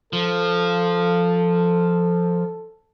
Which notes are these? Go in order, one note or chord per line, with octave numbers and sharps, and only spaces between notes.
F3 A4